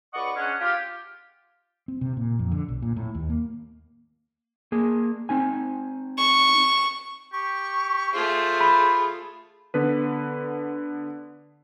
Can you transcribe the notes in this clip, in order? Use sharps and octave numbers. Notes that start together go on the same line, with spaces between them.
C#2 B4 D5 D#5 F#5 C#6
G#3 C#4 D4 F#5
F4 G4
C4
C3
A#2
F2
D3
B1
A#2
A2
D#2
A#3
A#3 G#4
C4 D#4 G#5
C#6
G4 C#6
A3 F4 G#4 C5
B5
D3 B3 B4